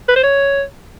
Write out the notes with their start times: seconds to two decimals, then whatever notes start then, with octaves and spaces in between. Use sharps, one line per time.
0.08 B4
0.16 C5
0.23 C#5